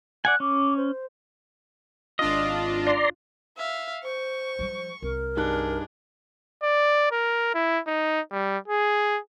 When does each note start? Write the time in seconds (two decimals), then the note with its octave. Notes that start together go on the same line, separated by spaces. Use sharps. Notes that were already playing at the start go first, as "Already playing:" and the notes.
0.25 D5 F#5 G#5 F#6
0.40 C#4 D6
0.76 C5
2.19 G#1 D4 F4 D#5
2.87 D5 A#5 C6
3.57 E5 F5
4.04 C5 C#6
4.59 F3 G3
5.02 C2 A#4
5.37 G2 D4 D#4 G#4 F#6
6.63 D5
7.12 A#4
7.54 E4
7.87 D#4
8.32 G3
8.68 G#4